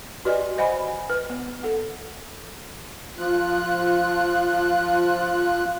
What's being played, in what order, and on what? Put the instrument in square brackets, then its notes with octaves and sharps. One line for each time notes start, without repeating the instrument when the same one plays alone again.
[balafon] F#4 G4 B4 D5 D#5 G#5
C5 D#5 F#5 G#5 B5
B4
B3
A4 F#5
[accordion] F3 F4 F#6